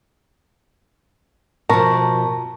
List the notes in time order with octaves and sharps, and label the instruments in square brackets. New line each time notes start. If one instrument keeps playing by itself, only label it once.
[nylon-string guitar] B2 F3 [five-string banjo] A#4 [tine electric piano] A5 A#5 C#6